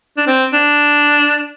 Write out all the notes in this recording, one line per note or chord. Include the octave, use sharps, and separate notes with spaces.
D4
C4
D4